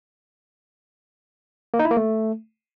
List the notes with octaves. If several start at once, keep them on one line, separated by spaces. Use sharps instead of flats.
A#3
D#4
E4
A#3
A3